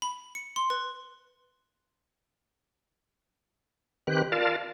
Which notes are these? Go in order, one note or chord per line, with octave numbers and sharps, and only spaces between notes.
B5
C#7
C6
B4
D#3 C4 G4 B4 F#6
F4 A#4 D5 F5 A5